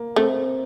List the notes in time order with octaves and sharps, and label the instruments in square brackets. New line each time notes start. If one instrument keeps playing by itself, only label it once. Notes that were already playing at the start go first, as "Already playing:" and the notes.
Already playing: [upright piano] A#3
[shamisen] A3 [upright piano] C4